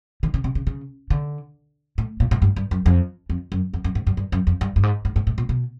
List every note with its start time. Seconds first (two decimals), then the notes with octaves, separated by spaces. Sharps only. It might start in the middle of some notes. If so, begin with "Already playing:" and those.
0.23 D#3
0.34 C#3
0.44 C3
0.55 C#3
0.67 C#3
1.10 D3
1.98 A2
2.20 A#2
2.31 A2
2.42 G2
2.56 G2
2.71 F#2
2.86 F2
3.30 F2
3.52 F#2
3.74 F2
3.84 F#2
3.95 G#2
4.07 G2
4.17 G2
4.32 F#2
4.47 F2
4.61 G2
4.76 G2
4.83 G#2
5.05 G#2
5.16 G#2
5.27 A2
5.38 A#2
5.49 B2